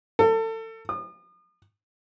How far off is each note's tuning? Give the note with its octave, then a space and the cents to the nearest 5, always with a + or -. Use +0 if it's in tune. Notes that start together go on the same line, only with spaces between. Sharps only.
A4 +30
D#6 -40